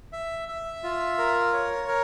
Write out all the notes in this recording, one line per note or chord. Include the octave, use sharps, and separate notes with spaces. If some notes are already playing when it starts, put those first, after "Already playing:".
E5
E5
F4
A#4
C#5
A#4